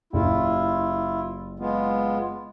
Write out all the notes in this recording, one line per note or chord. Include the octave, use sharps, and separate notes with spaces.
F#1 E4 F4 G4
G#3 B3 F4